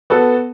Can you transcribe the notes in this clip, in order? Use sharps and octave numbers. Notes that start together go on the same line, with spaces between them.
B3 F#4 A4